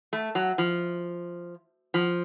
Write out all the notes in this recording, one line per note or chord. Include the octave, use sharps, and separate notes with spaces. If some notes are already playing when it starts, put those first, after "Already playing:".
A3
F#3
F3
F3